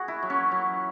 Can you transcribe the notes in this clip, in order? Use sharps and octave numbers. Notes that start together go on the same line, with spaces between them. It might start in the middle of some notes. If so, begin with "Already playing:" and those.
Already playing: F#4 G#4
E4
F#3
C#4
F#3